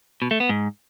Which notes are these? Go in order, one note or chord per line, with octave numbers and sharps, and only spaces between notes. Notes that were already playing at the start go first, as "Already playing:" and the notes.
B2
A3
B3
G#2